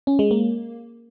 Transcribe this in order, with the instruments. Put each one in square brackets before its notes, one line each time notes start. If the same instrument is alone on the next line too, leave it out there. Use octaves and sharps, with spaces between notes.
[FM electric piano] C#4
G#3
A#3